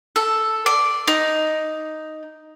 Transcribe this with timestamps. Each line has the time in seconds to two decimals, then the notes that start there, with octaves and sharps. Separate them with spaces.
0.16 A4
0.66 D5
1.08 D#4